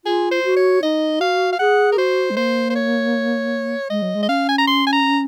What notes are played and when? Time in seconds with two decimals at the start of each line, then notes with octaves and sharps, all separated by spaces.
0.05 F4 G#4
0.31 C5
0.45 F#4
0.57 C#5
0.83 D#4 D#5
1.20 F#4 F5
1.53 F5
1.59 G#4 F#5
1.92 A#4
1.97 F#4 C5
2.30 G#3
2.37 A#3 C5
2.70 C5
2.75 C#5
3.90 G#3 D#5
4.02 F#3
4.15 G#3
4.23 D#5
4.29 C#4 F5
4.49 G#5
4.58 A#5
4.67 C6
4.87 G#5
4.93 A#5